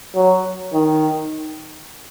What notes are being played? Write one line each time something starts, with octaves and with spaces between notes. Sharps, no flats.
F#3
D#3